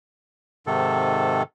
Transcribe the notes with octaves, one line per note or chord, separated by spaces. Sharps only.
G#2 C3 D#3 A4